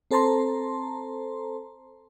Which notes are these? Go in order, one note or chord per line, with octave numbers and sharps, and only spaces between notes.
C4 A4 C5 A5 A#5 C6